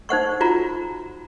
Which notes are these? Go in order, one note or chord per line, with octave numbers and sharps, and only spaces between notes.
D#4 C5 F#5 C#6
F4 F#4 A#5